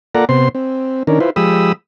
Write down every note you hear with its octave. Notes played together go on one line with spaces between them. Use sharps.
A#3 F4 A4 D5 F#5 A#5
C3 B3 C5 C6
C4
D#3 C#4 D4 A#4
E4 F4 B4 C5
F3 G#3 G4 B5 D#6 E6